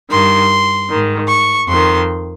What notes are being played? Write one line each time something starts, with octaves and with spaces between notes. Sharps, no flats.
G2 D#3 C6
G#2 D#3
C#6
F2 D#3 C6